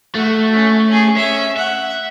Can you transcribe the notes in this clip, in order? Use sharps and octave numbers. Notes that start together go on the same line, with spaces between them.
A3 F#4
C#4
C#4 G#4
C#4 E5
E5 F#5